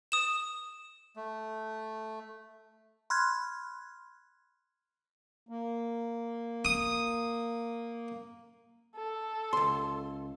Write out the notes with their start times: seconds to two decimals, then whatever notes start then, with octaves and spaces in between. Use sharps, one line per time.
0.12 D#6 E7
1.16 A3
3.10 B5 C6 F6 F#6 G#6
5.49 A#3
6.65 D#6
8.96 A4
9.53 C#2 C6